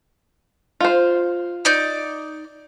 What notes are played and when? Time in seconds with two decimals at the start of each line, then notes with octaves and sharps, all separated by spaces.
0.80 F4 C5
1.65 D#4 D5 G6